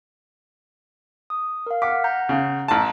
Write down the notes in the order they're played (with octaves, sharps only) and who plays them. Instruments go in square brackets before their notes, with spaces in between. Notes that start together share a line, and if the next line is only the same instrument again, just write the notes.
[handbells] D#6
A#4 F5
[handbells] F#5 F6 B6 [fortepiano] D6
[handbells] F#5 A#5 G6
[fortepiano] C#3
A1 A5